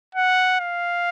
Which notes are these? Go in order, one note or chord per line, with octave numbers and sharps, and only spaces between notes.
F#5
F5